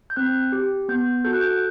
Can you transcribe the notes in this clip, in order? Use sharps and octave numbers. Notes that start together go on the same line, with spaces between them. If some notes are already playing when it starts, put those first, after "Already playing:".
G6
C4 F#6
G4
B3 G6
F#4 A4 G6
F#6
G6